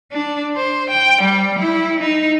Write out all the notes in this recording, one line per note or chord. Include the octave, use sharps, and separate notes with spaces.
D4
C5
G5
G3
E4
D#4